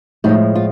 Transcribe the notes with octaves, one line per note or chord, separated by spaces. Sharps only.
A2 F3 G#3 D#4
F4